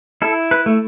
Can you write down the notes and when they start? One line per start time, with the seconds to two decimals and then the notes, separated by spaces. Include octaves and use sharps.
0.22 E4 A4
0.51 B4
0.66 A3